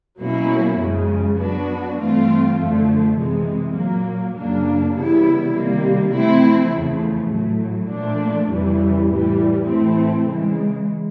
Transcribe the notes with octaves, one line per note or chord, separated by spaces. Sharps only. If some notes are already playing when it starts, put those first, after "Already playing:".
B2 F#3 A#3 C#4 E4
F#2 C#3 F3 G#3
F#3 B3 D4 F#4
G2 E3 A3 C4 F4
F#2 D3 F3 A3
C3 E3 G#3
A#2 F#3 A#3
F#2 C#3 F#3 A#3 D4
C#3 E3 G3 B3 E4
C3 D#3 G3 A#3
F3 A3 C4 E4
E2 C#3 F3 A3
A2 F#3 A3
A#2 F3 A3 D4
F2 C#3 E3 G3
A2 E3 G3
A2 E3 A3 C4 E4
C#3 E3 G#3